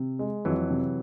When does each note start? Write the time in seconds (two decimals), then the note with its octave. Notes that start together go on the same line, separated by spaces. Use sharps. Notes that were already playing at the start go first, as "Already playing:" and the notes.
Already playing: C3
0.19 G#3
0.45 F2 E3 F#3
0.70 C3